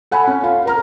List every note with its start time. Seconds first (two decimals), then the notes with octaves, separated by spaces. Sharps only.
0.11 A4 F#5 G#5 B5
0.27 C#4
0.43 F4 F5
0.65 A#4 A#5 F6